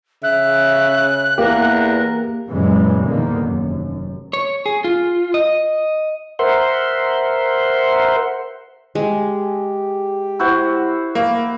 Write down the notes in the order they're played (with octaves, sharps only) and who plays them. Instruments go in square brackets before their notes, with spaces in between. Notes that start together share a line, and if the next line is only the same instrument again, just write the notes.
[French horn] C#3 [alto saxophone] E5 [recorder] F#6
[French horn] E2 [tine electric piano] A#3 G4 [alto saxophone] A#4
[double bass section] F#2 A#2 C#3 E3 G3 G#3
E2 G#2 D3 D#3 A#3
F1 F#2
[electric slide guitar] C#5
G#4
F4
D#5
[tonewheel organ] A#4 C5 E5 F#5 C6
[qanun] G#3 [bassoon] G4
[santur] E4 F#4 C5
[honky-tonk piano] A#3